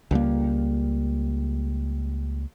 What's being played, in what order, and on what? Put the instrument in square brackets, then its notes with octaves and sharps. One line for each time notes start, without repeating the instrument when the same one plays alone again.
[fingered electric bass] C#2 G3 A#3